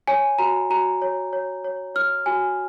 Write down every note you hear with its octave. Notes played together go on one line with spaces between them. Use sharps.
C#5 G#5
F#4 A#5
F#4 A#5
C#5
C#5
C#5
C#5 F6
F#4 G#5